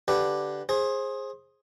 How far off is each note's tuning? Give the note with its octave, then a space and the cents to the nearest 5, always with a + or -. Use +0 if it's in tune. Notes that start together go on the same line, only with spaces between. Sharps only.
D3 +0 G4 +0 B4 +0
G#4 +0 C5 +25